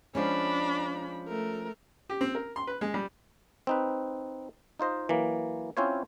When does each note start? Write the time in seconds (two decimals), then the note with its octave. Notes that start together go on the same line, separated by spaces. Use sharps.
0.15 F3 G#3 C#4 D4 B5
1.28 A3 A#4
2.10 G4
2.21 C4
2.35 A#4
2.56 C6
2.67 B4
2.81 G#3
2.94 G3
3.67 C4 D#4 B4
4.80 D#4 F4 C5 D#5
5.09 E3 F#3 A#3
5.77 C4 C#4 E4 F4 C5 C#5